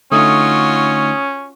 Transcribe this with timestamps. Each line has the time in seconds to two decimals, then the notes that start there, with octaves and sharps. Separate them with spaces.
0.12 D3 A3 C#4 D#4 F4 F#4 D#6